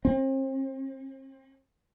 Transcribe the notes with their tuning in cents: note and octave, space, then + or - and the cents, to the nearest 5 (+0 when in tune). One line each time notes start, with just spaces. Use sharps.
C4 +40